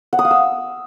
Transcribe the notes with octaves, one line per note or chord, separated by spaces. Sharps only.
F#5
D#6
F5
E6